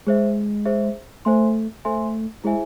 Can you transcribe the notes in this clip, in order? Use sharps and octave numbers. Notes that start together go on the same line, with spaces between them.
G#3 G#4 C5 E5
G#4 C5 E5
A3 C5 E5 G#5 C6
A3 C5 E5 G#5 C6
G#3 E4 G#4 C5 E5 G#5